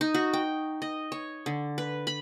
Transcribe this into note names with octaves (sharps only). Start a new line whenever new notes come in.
D#4
F#4
G5
D#5
C#5
D3
B4
B5